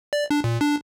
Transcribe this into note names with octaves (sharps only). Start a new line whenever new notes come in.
D5
D4
A#2
D4